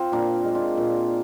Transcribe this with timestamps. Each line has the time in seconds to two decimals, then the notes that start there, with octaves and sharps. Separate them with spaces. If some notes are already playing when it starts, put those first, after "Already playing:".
Already playing: C4 F4
0.12 A#2 A#3 D4
0.44 G#3
0.55 D4 F4
0.77 A#2